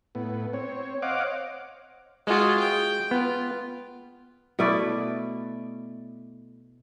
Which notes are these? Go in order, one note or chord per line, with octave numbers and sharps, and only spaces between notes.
A2 B3
C4 C#5
C5 C#5 D#5 F5 F#5 D6
G#3 F4 F#4 G#4
G5
B3 F4
B2 A3 E4 D5